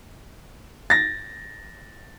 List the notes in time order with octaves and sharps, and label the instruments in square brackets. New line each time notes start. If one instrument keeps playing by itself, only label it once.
[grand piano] A6 A#6